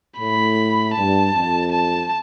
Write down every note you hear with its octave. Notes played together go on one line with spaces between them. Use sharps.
A2 B5
G2 A5
F2
A5